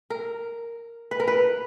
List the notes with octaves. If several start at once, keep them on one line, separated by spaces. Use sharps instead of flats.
A#4
B4
A#4
B4